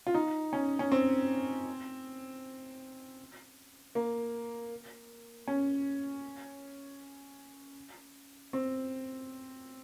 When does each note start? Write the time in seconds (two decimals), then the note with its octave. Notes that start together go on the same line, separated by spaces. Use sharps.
0.07 F4
0.14 D#4
0.53 C#4
0.79 C#4
0.92 C4
3.95 A#3
5.48 C#4
8.53 C4